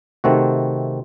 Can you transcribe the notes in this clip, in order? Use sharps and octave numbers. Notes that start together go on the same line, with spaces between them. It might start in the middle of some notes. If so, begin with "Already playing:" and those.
C3 D#3 A3 C4 F#4